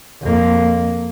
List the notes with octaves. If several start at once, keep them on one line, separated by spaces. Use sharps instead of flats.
F2 A#3